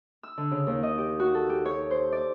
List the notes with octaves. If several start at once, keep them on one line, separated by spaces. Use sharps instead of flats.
E6
D3
C#3
D#2
D#5
G4
F#4
A4
G4
C#5
C5
D5